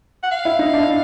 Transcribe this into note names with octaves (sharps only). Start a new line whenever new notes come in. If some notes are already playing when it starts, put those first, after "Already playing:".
F#5
F5
E4
D#4
D4 E4